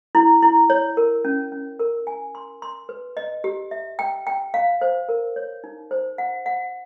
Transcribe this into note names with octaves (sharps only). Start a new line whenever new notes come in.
E4
E4
C#5
A#4
C#4
C#4
A#4
G#5
C6
C6
B4
D#5
G4
E5
G5
G5
F5
C5
A#4
C#5
D#4
C5
F#5
F#5